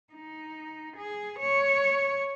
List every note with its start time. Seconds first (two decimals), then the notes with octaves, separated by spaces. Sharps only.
0.13 D#4
0.97 G#4
1.39 C#5